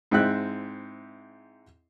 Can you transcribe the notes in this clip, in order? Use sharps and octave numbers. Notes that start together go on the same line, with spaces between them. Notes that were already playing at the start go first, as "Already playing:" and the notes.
G#2 C4 E4 E5 G5 F#6